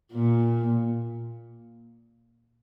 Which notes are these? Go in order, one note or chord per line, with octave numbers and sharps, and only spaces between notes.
A#2